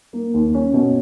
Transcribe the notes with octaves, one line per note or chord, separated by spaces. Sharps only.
A#3
D#2
C#4
B2